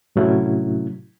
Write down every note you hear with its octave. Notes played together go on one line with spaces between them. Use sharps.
A2 C3 F#3 A3 C#4 E4